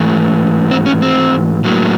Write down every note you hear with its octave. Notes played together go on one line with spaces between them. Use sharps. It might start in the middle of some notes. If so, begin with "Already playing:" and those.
Already playing: G#2 E3 A3
C4
C#4
C4
A2 F#3 A#3